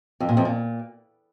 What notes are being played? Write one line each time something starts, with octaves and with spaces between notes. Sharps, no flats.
F2
A#2
F2
A#2